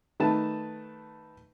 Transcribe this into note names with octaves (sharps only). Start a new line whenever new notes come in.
D#3 A3 B4 A5